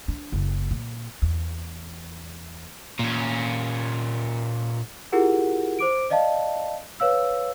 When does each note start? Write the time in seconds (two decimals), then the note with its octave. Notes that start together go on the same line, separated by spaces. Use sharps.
0.08 D4
0.32 F#1
0.71 A#2
1.22 E2
2.99 A#2 C#4
5.12 E4 F4 G4 G#4 A#4 F#5
5.79 C5 D6 D7
6.10 D5 D#5 F5 A5
7.00 B4 C#5 F5 E6